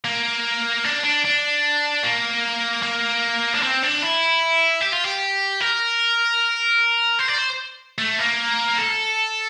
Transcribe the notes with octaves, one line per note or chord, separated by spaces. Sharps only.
A#3
D4
D4
D4
A#3
A#3
D4
C4
D4
E4
G4
F4
G4
A#4
C5
D5
C5
A3
A#3
A4